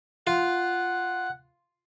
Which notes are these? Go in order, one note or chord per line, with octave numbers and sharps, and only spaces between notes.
F4 F#5